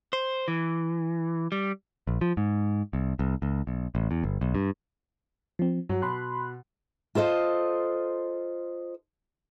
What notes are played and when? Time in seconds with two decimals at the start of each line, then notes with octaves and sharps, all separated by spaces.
0.13 C5
0.48 E3
1.52 G3
2.07 A#1
2.21 F3
2.37 G#2
2.93 C2
3.19 C2
3.42 C#2
3.67 B1
3.95 A1
4.11 E2
4.24 G1
4.41 B1
4.55 G2
5.59 F3 C4
5.89 G2 F#3
6.02 B2 B5 C6 F#6
7.15 F4 A4 C5 D#5